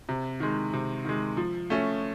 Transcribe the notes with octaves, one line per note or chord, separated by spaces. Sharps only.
C3
D#3 G#3
C3
D#3 G#3
F3
A3 C#4